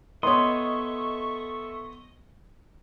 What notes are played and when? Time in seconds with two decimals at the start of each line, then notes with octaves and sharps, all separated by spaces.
0.23 B3 A4 C#5 D#5 E5 C6 C#6 D#6